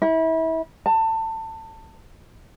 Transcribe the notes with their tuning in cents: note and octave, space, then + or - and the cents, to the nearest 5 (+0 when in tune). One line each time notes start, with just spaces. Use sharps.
E4 -30
A5 +25